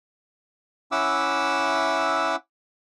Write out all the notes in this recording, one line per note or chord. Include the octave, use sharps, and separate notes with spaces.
C#4 E4 E5 F#5 D6 E6